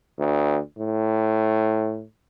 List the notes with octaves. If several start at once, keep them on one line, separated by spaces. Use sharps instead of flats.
D2
A2